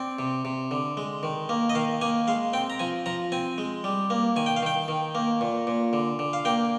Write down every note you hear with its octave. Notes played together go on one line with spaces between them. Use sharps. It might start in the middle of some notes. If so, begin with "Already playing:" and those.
Already playing: C4 D5
C3
C3
D3
G#3
D#3
A#3
D#5
D#3 F5
A#3 G#5
G#3 F5
C4 G5
A#5
F3 G#5
F3 A#5
C4 G#5
G#3
G3
A#3
D#3 G#5
G5
F5
D#3 G5
D#3
A#3
A#2
A#2
D3
D3
F5
A#3 G5